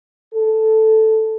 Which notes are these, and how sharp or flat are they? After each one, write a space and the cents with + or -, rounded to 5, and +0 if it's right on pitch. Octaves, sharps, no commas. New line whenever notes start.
A4 -5